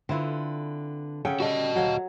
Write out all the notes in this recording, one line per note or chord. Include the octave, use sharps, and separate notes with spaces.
D3 C4 E4 F4 B4
C#3 C#4 A4 F#5 G5
G3 F#4 A4 D#5
D2 F#3 F5